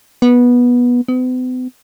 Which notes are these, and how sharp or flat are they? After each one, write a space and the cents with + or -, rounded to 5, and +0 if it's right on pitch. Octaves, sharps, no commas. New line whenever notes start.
B3 -15
B3 +45